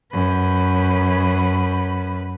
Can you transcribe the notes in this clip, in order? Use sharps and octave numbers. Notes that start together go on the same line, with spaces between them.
F#2 B4